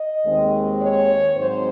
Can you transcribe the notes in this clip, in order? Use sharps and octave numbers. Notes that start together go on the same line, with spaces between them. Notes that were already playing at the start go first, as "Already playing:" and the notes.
Already playing: D#5
D#2 D#3 G#3 C4
C#5
G#2 F#3 C4 C5